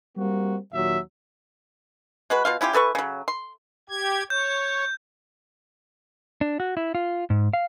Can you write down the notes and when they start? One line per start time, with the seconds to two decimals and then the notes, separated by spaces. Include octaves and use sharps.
0.16 G3 A#3 C4 F#4
0.72 D#2 A#2 F#3 E5
2.30 G#3 F#4 B4
2.45 B2 F4 F5
2.61 C#4 E4 F4 G4
2.73 E3 A4 B4 C#6
2.95 C#3 F#3
3.28 C6
3.89 G4 G#6
4.30 C#5 G6
6.41 D4
6.60 F#4
6.77 E4
6.95 F4
7.30 G#2
7.53 F5